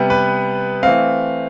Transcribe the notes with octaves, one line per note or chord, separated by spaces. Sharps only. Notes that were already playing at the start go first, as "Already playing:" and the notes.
Already playing: C3 G3 B3
B4
E3 A3 C4 F5